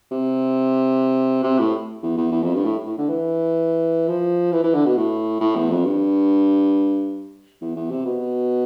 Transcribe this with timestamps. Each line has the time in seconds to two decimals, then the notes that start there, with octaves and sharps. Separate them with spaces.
0.11 C3
1.44 C3
1.59 A2
2.03 E2
2.17 E2
2.32 E2
2.43 F2
2.54 G2
2.65 A2
2.87 A2
2.98 D3
3.09 E3
4.08 F3
4.52 E3
4.63 E3
4.74 D3
4.85 B2
4.97 A2
5.40 A2
5.56 E2
5.70 F2
5.85 G2
7.61 E2
7.76 E2
7.91 C3
8.05 B2